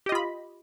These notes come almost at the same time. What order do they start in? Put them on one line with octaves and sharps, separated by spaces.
G4 D#5 F4 B5